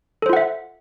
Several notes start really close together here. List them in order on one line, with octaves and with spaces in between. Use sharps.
A4 C5 F4 F#5 E5